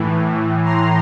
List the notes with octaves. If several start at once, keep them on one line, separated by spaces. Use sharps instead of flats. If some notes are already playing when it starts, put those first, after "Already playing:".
Already playing: A2 E3
A#5 C6